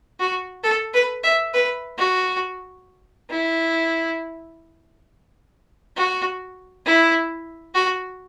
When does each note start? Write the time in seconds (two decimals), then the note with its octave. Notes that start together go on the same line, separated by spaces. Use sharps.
0.20 F#4
0.64 A4
0.94 B4
1.24 E5
1.53 B4
1.98 F#4
3.30 E4
5.97 F#4
6.86 E4
7.74 F#4